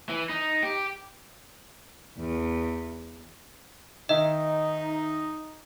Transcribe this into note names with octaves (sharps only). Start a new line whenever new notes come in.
E3
D#4
G4
E2
D#3 D#4 D#5 E5